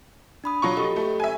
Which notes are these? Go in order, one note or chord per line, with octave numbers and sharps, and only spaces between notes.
D4 B5 D#6
F#3 F4 C#6
G4 A4 D#5
A3
E5 G#5